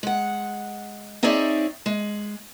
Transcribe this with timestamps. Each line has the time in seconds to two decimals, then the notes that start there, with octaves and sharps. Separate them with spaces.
0.03 G#3 F#5
1.23 C4 D#4 G#4 C#5 D5 E5
1.86 G#3